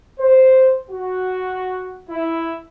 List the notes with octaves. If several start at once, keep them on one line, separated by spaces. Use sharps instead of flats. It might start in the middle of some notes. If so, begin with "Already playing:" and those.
C5
F#4
E4